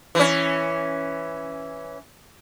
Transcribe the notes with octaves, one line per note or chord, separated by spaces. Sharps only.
E3 C#4